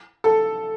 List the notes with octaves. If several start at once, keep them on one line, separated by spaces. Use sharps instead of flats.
A4